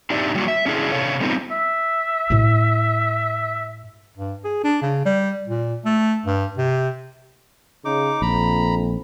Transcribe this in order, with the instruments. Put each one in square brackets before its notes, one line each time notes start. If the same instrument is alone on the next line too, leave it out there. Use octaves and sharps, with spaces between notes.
[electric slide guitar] C4 D4 D#4 G4 D5 E5
F#3 G3 A#3 F4 F#4
E5
C#4 D4 E4 G#4
C3 A4 C#5 F5
G3 B3 C4 D#4 F4
[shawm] E5
[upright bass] A2 E4
[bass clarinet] G2
G#4
D4
C#3
G3
A#2
A3
G2
C3
[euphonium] C#3 [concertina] D#4 D6
[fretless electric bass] A#1 [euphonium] F2 [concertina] A#5 B5